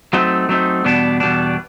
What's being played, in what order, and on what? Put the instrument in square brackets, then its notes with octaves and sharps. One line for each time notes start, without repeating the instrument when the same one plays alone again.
[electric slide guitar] F#3 A3 C4 D#4
F#3 A3 C4 D#4
E2 B2 G3 B3 D4
E2 B2 G3 B3 D4